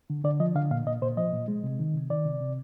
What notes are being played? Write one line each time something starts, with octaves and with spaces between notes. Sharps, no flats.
D3
D3 D5
F3 D#5
D3 F5
A#2 F5
A#2 D#5
A#2 C5
F3 D#5
A#2
G#3
C3
D#3
C3
D#3 D5
C3
C3